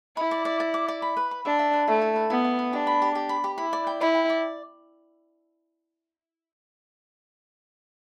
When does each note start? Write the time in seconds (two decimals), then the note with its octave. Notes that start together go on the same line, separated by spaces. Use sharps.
0.17 E4 B5
0.31 D5
0.45 D5
0.60 D5
0.74 D6
0.88 D5
1.02 B5
1.17 B4
1.31 B5
1.45 D4 E5
1.59 E5
1.73 B4
1.87 A3 E4
2.02 E4
2.16 B4
2.30 B3 E4
2.44 E4
2.59 B4
2.73 D4 G4
2.87 B5
3.02 G4
3.15 G4
3.29 B5
3.44 G4
3.58 E4 B5
3.73 D5
3.87 G5
4.01 E4 B5
4.15 G5
4.30 D5